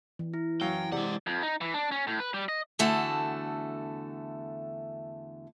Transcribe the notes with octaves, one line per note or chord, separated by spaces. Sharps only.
E3
E4
F#2 F#3 F5 G5
C3 G#3 D5 F#5
F2
D#4
E3
D4
C#4
A2
B4
G3
D#5
E2 D3 A3 F#4 A4